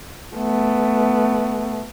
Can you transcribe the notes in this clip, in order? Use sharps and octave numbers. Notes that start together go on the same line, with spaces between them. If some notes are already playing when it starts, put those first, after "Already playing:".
A3 B3